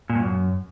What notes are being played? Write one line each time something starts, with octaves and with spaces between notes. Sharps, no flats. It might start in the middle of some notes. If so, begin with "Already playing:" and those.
A#2
G2
F#2